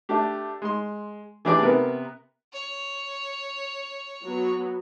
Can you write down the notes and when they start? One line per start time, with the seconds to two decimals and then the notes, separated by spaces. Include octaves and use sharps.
0.09 A3 D4 G4
0.62 G#3 C6
1.45 E3 A3 D4 G4 G#4 D5
1.62 C3 B3 A#4 B4
2.53 C#5
4.23 F#3 B3 F#4